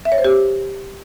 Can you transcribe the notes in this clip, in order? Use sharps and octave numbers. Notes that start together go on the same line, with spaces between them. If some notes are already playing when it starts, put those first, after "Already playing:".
E5
C#5
C5
G4